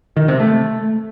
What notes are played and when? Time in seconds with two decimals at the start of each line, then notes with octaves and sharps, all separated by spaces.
0.17 D#3
0.28 C3
0.40 A3